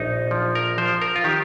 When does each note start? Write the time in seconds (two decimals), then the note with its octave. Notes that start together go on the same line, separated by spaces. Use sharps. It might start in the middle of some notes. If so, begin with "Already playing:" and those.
Already playing: A#1 D#4
0.31 F3
0.55 A#4
0.78 F3 C5
1.02 A#4
1.16 F4
1.24 D#3 G4